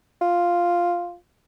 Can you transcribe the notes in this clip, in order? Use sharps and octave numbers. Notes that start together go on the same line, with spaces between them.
F4